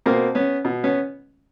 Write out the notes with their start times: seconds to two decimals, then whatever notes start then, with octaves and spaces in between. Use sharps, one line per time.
0.06 B2 A#3 C4
0.35 B3 C#4
0.65 B2
0.84 B3 C#4